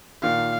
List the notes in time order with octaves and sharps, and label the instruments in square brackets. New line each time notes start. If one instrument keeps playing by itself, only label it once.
[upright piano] A#2 D#3 [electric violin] F5